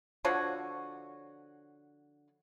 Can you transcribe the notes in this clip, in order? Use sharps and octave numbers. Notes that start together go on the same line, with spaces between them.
D3 F3 F#4 C#5